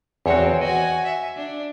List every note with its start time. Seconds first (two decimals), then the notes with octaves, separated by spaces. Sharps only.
0.26 E2 C4 F#4 C#5
0.61 F#4 D#5 G#5
1.05 E5
1.37 D4